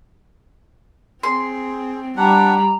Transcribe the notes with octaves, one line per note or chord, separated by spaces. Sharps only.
C4 G#4 C6
G3 D4 F#5 A#5 B5